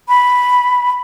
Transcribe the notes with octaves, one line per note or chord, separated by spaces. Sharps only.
B5